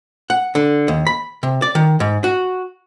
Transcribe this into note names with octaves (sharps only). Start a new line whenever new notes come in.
F#5
D3
D#2
B5
C3
D5
D#3
G#2
F#4